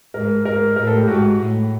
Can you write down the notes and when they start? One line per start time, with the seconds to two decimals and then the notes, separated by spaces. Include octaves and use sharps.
0.14 G#2 A#4
0.45 G#2 A#4
0.76 A2 A#4
0.87 A4
0.98 G4
1.08 G#2 F#4
1.39 A2